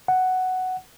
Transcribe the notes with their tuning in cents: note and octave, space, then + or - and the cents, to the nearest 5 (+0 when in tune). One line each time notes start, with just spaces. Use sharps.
F#5 +5